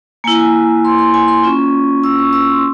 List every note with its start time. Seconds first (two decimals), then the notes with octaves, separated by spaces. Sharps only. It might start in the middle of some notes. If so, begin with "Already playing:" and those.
0.24 A#3 E4 G#5
0.40 G#5
0.85 C6
0.99 C6
1.14 G#5
1.28 C6
1.43 A#3 C#4 F4 C#6
2.04 E6
2.18 C#6
2.33 E6
2.42 C#6
2.50 C6